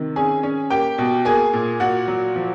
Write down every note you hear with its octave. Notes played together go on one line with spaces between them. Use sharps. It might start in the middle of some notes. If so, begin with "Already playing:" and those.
Already playing: C3 D#3
C#4 G#4 G#5
C#4
A#3 G4 G5
B2
A#3 G#4 G#5
A#2
A#2 F#4 F#5
F#3
F3